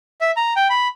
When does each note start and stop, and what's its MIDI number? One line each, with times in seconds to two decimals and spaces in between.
0.21 0.31 76
0.37 0.53 82
0.56 0.68 79
0.70 0.88 83